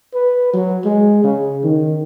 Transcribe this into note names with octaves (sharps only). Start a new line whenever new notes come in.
B4
F#3
G#3
C#3
D#3